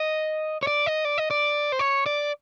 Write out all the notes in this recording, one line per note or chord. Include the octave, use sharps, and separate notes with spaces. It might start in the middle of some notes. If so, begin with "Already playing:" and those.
Already playing: D#5
C#5
D5
D#5
D5
D#5
D5
C5
C#5
D5